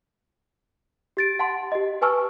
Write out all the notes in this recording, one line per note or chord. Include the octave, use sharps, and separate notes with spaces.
G4 A6 D7
F#5 A5 C6
G4 D#5
B4 G#5 A5 C#6 E6 F6